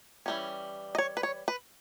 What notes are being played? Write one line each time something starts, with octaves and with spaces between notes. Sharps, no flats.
E3 G3 C#4
D#5
C#5
B4
C#5
B4